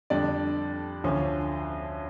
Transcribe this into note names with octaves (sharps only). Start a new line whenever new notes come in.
F2 D3 G3 D4 D5
D2 D3 F3 C#4